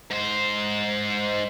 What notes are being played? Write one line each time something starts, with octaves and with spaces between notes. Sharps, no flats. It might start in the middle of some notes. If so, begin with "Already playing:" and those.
G#2 C5